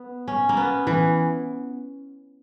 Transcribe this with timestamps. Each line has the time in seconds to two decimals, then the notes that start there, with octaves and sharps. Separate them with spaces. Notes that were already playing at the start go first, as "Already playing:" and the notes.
Already playing: B3
0.28 C#4
0.49 A#3
0.57 B3
0.87 E3